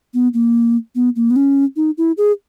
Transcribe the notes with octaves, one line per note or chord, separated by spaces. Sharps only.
B3
A#3
B3
A#3
B3
C#4
D#4
E4
G#4